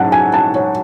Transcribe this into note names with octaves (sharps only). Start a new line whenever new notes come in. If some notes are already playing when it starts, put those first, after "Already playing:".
Already playing: G#2 F#3 C#4 F#5 A5
G#5
A5
C#5